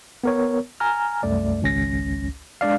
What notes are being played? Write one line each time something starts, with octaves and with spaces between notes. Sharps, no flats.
B3 A#4 C#5
G#5 A#5 F6
C2 F#2 A3 D5
G#1 C#2 C#4 A#6
G#3 D4 D5 F5